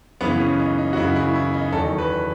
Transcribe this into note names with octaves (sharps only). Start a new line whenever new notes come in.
F#2 C#3 E3 B3
C#4
D#4
D#4
F#4
F#2 C#3 E3 E4
E4
E4
D#4
E2 D#3 F#3 A4
B4